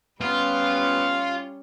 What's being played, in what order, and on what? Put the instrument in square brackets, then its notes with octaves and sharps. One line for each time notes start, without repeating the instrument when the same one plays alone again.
[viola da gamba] G3 C#4 [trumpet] B3 [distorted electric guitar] F4